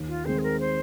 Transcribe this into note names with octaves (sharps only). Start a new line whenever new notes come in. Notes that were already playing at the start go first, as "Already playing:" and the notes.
Already playing: D#2
F4
D#3 G#3 C4 C5
G#4
A#4
C5